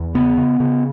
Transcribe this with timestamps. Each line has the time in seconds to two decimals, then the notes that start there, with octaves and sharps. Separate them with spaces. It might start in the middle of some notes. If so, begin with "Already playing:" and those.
Already playing: E2
0.15 C#3 B3
0.37 C#3
0.60 C#3